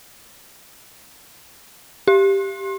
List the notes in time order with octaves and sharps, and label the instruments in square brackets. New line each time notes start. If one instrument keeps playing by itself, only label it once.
[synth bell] G4